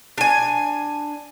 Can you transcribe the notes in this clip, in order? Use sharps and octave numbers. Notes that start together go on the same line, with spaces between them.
D4 G#5